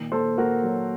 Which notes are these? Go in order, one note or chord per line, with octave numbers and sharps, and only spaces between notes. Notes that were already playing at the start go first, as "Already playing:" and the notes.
Already playing: A#2 D#3
A#2 A4 C5
A#3 F#4 A#4
F#3